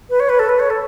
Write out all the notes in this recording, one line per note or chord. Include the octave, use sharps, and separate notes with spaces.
B4
C#5
B4
A4
B4
C#5
A4